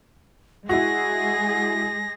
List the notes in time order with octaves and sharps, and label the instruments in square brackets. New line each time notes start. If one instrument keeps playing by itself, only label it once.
[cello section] G#3 G#4 [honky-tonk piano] E4 F#4 [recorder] A#6